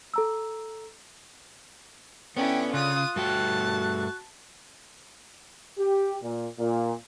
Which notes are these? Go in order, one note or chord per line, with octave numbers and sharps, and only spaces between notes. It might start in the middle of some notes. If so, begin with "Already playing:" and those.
A4 A#5 E6
D3 B3 C#4 E4 G5
C#3 F4 D#6 F#6
G2 A3 F#4 G5 A5
G4
A#2
A#2